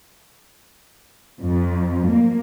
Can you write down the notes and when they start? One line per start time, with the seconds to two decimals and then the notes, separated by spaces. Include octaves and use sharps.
1.41 F2
2.08 A#3